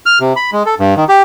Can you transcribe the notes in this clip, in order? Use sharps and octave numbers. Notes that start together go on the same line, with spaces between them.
F6
C3
B5
G#3
A4
G2
D#3
G4